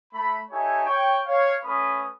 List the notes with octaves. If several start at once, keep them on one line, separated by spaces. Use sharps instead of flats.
A3 B5
D#4 G4 A4 C#5 E5 G#5
C#5 G5 C#6
C#5 F5
A3 C#4 B4 B5 D#6